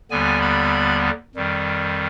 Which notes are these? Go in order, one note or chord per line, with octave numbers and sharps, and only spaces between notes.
D#2 D3 G3 B3 G#5
B5
F2 D#3 G3